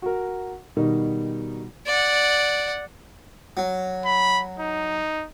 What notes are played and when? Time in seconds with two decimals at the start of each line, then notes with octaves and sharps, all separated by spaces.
0.02 F#4 A#4
0.76 B2 D#3 G3 D#4
1.86 D5 F#5
3.57 F#3
4.05 B5
4.60 D#4